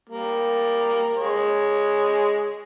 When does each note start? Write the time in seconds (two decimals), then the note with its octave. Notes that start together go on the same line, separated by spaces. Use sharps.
0.10 G3 A#3
1.17 G#3 C#5